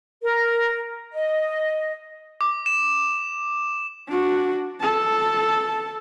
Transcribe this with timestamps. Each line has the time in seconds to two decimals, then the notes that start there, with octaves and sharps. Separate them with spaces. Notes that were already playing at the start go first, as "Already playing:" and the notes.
0.22 A#4
1.13 D#5
2.41 D6
2.66 E7
4.08 D4 F#4
4.81 A4 A5